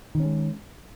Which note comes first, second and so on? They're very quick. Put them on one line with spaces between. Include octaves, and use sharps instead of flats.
D#3 C#4 G#3